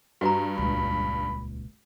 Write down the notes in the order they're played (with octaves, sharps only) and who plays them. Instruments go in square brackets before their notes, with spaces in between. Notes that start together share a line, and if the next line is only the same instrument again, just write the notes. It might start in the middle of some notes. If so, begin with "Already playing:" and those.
[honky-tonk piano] G2 [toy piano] F#4 B4 A#5
[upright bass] D#1 C#2 [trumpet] B5